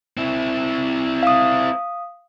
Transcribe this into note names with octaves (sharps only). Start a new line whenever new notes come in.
C4 E4
F5 D#6